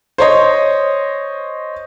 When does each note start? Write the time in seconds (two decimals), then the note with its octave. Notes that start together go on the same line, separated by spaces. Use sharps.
0.18 C5 C#5 D#5